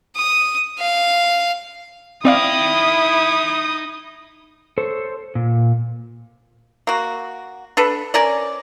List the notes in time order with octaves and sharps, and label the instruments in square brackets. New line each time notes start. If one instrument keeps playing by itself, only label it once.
[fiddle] D#6
F5
[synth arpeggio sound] C4 D5 F5 [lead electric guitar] D#4 G5 [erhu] E4 [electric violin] D#6
[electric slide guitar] A4 C5 C#5
A#2
[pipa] A#3 F#4
D4 A4 B4
C#4 A#4 D5